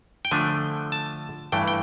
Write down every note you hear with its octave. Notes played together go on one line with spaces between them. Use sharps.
G5
D3 F3 A3 D4 G#5
A5
G2 E3 A3 G5
G5